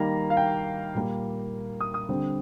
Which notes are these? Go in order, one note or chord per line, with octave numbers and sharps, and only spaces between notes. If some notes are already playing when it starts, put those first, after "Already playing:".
Already playing: D#3 G3 A#3 A#5
F5
G5
A#2 G3 A#3
D#6
D#6
D3 G3 C4